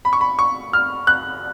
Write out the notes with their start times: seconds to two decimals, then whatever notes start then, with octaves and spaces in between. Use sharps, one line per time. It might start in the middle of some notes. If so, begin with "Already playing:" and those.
0.05 B5
0.13 C#6
0.21 B5
0.39 C#6
0.73 F6
1.07 F#6